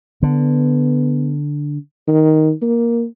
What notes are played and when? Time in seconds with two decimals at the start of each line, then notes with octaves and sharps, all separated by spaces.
0.23 D3 B3
2.07 D#3
2.62 A#3